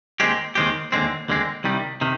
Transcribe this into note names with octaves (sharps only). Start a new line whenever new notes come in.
D#2 D#3 G#3 C4 G4
D#2 D#3 G#3 C4 G4
D#2 D3 G#3 C4
D#2 D3 G#3 C4
C2 C3 D#3 G3
C3 D#3